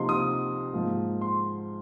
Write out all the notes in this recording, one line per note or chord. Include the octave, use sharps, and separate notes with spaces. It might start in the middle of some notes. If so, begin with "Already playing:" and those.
Already playing: C3 F3 A#3 D#4 C6
D#6
G#2 F3 A#3
C6